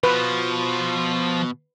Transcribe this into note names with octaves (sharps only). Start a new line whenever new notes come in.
B2 F3 B4